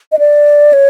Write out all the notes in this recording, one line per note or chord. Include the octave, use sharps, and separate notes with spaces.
D#5
D5
C#5